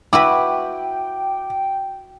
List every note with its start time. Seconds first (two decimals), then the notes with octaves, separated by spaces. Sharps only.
0.13 E4 F#4 B4 G5 D6